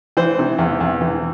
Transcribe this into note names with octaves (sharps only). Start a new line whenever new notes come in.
E3 C5
C3
E2
E2
E3